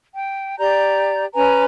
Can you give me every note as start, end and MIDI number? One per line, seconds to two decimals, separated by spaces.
0.15 0.58 79
0.59 1.24 67
0.59 1.24 74
0.59 1.24 82
0.59 1.24 91
1.34 1.65 61
1.34 1.65 71
1.34 1.65 80
1.34 1.65 82